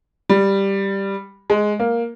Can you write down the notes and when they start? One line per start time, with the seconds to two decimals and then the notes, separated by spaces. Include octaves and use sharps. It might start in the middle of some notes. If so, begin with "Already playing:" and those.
0.29 G3
1.50 G#3
1.80 A#3